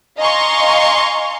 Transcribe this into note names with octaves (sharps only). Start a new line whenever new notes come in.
D#5 F5 G#5 A#5 C6 C#6